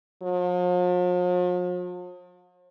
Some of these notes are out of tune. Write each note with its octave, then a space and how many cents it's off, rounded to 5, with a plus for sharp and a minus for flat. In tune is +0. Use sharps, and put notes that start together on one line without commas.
F3 +45